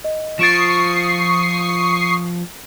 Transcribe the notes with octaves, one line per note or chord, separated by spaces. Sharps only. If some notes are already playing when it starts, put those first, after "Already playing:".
D#5
F3 F4 C#6 D#6 A6 C7 D7 E7